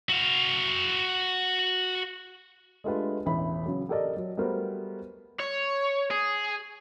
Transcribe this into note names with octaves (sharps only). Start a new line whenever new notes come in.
F#4 F5
G#3 A3 D4 F4 G4 B4
E1 A1 E4 B5
C#3 F#3
G4 A4 A#4 D5 D#5
F#3
G3 A3 B3 F#4 A#4 C5
C#5
G#4